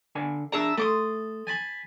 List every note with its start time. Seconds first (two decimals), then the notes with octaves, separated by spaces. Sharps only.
0.15 D3 D5 G#5
0.52 D4 G#4 D5 E5 A5 A#5
0.78 A3 A4 C6 D6 D#6
1.47 G#5 A5 B5